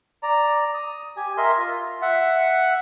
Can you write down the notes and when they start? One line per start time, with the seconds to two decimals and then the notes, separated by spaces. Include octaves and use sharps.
0.23 D5 A#5
0.74 D#6
1.17 G4 G#5
1.37 A#4 D#5 E5 C6
1.57 F4
2.02 E5 F#5